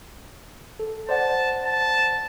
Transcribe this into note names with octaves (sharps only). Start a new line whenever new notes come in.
A4
C5 D5 F#5 A5
A5